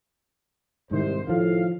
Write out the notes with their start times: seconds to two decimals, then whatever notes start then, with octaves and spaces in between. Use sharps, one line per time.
0.91 C2 G#2 D#3 C5
1.28 A2 D#3 F3 F5